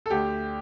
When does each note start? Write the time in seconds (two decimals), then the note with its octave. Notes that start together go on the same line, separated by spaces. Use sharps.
0.06 A4
0.10 D2 D3 A3 G4